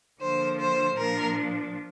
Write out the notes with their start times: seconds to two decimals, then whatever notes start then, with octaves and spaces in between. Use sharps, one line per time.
0.20 D3 F3 A#3 C5
0.58 C5
0.96 A#2 F3 A#3 D4 A#4